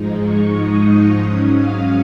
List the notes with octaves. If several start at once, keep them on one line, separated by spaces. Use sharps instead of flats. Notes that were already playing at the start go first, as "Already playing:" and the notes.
Already playing: G#2 F3 G#3 D#4
C#6
D#6
C#6
G#2 F#3 C#4 D#6
F5